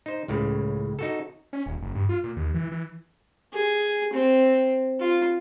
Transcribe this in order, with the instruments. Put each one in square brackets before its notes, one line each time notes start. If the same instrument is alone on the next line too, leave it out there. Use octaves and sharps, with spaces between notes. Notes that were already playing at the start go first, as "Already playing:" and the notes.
[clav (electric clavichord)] D#4 C5
C#2 A2 C#3
D#4 F#4 A4
[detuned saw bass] C#4
D#1
F#1
G2
F4
A#2
D#2
E3
E3
[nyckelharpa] G#4
C4
F4